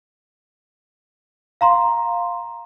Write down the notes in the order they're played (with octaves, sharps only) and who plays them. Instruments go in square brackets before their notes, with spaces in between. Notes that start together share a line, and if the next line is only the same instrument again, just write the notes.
[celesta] F5 A#5 C6